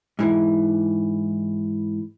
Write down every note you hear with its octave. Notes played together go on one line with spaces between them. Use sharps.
G#2 E3